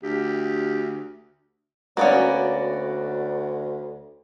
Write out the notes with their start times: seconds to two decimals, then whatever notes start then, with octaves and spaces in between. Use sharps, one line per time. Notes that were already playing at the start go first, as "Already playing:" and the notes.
0.03 D2 G4
1.97 D2 A#3 B3 C#4 F#4 D5